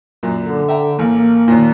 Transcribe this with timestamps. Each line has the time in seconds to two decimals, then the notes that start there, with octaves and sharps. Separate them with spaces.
0.23 F#2 A#2
0.40 D3
0.68 E5 G5 A#5
0.99 A1 A#3
1.18 A#3
1.48 D#2 A#2